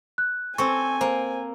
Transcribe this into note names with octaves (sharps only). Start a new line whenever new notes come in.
F#6
C4 A4 G#5 C#6
A#3 C5